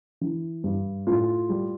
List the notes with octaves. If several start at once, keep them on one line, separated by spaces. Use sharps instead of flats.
E3
G2
A2 F4
G3